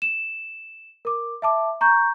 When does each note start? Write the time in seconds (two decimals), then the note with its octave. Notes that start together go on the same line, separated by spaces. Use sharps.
0.02 E7
1.05 A#4 D6
1.42 E5 A5 D6
1.81 A#5 C#6 G6